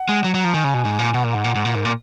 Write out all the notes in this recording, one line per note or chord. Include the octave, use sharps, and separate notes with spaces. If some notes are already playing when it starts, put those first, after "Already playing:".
Already playing: F#5
G#3
F#3
F#3 A#5
F3
D#3 G#5
C#3
B2
G#2
A#2
B2 F#5
A#2 F5
G#2 F#5
A#2
G#2
A#2
G#2 A#4
A#2